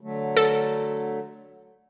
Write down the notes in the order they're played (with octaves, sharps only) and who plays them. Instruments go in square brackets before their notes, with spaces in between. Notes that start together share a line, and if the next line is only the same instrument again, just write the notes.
[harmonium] D3 F#3 A3
[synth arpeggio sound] A4